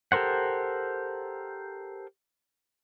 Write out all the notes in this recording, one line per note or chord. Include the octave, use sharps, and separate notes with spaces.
G4 A4 A#4 C5 F#5